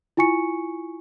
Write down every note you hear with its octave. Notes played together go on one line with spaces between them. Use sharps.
E4 F4 G#5 C#6 C#7